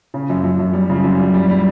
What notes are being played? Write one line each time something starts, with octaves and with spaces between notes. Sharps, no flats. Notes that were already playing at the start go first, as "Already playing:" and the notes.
C#3
F#2
F#2
F#2
G3
C#3
F#2
G3
G3
G3